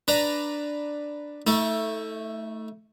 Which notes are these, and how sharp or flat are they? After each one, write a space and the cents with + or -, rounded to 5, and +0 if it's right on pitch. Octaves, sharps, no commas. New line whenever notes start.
D4 +0 B4 +0 A#5 +0
A3 +5 D#4 +45